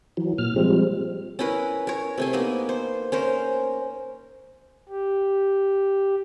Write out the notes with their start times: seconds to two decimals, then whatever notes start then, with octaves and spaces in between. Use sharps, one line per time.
0.17 E3 F#3
0.38 A#2 F6
0.56 F3 G3 G#3 C4
1.39 C#4 E4 A#4 B4
1.87 A#4 C#5
2.18 C3 A3 G#5
2.33 A#3 B3 D#4
2.69 C5
3.12 C#4 A#4 C5
4.89 G4